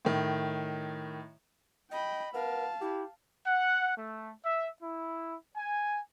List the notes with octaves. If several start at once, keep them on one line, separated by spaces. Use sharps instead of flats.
A2 D#3
D#5 G5 B5
B3 A#4 F5 A5
E4 G4
F#5
A3
E5
E4
G#5